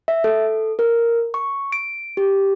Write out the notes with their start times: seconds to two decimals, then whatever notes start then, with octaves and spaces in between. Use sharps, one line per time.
0.08 E5
0.24 A4
0.79 A#4
1.34 C#6
1.72 D7
2.17 G4